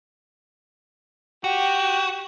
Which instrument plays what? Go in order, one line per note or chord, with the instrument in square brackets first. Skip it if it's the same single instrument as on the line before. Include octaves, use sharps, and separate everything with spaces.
[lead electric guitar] F#4 [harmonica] G4